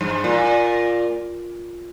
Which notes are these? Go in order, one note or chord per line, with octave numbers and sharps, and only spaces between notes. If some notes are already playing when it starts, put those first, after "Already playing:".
G2
A#2